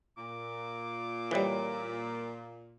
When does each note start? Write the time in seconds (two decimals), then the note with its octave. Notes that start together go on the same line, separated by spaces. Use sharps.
0.18 A#2 D6
1.31 E3 G3 A4 C5 C#5